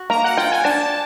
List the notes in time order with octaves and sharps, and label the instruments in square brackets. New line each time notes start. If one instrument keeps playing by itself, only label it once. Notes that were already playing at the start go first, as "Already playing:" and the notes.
Already playing: [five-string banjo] F#4
[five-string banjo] A#3 [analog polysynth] A#5
[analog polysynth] F#5
[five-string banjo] F4 [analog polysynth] G5
[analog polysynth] G#5
[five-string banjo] D4 [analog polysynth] A5